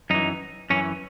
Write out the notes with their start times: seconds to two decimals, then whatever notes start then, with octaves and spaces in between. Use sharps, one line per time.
0.10 F#2 E3 D#4
0.70 F#2 E3 C#4